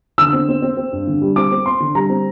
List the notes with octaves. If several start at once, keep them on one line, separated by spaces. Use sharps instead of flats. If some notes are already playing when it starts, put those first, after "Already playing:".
D3 E6
C4
C4
C4
C4
G2
D3
G3
C4 D6
C4
C4 C6
D3
G3 A#5
C4